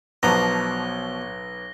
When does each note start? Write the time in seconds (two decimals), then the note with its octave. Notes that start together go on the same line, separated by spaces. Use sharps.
0.23 B1 B2 F3 B3 D4 A#5 A#6 G7